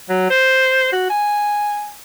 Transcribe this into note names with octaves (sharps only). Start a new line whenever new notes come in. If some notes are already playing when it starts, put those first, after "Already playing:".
F#3
C5
F#4
G#5